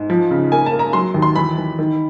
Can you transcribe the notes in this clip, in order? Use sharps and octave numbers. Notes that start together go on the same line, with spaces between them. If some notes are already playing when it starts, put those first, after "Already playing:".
Already playing: G#2
F3
C#3
A#3 G#5
A5
A#3
A#5
F#3 C6
D#2
C6
E3 B5
E3
D#3